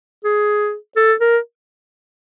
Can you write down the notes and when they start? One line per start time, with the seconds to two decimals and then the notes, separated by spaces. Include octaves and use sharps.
0.25 G#4
0.96 A4
1.21 A#4